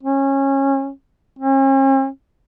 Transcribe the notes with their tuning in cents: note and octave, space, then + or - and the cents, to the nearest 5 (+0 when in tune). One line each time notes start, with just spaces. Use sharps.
C#4 -20
C#4 -45